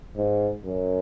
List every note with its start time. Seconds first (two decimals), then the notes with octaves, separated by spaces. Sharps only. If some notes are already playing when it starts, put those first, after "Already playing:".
0.16 G#2
0.64 F#2